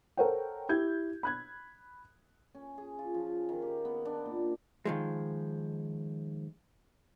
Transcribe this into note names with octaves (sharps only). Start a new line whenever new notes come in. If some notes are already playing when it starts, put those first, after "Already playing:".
A4 A#4 C5 C#5 F#5 G5
E4 G4 G6 G#6
B5 F#6 G#6
C#4
G#4
F4
F3
D#3
G4
B3
D4
A#2
D#3 F3 G#3